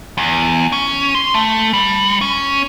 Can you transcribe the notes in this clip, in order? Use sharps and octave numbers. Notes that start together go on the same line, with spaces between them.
E2
C#4
C6
A3
G3
C#4